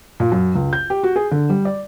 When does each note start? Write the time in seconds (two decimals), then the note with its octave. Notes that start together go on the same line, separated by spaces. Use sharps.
0.20 A#2
0.32 F#2
0.55 C#2
0.73 G6
0.90 G4
1.03 F#4
1.16 G#4
1.31 D3
1.50 G3
1.65 D5